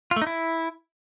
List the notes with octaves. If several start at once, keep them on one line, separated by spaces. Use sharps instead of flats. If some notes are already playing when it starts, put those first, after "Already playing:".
F4
A3
D#4
E4